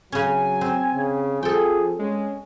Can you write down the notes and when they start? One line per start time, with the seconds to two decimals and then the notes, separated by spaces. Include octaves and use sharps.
0.12 C#3 F#3 C#4 G#5
0.61 C4 C5
0.95 C#3
1.43 F3 G#4 A4 G5
1.99 G#3 C#4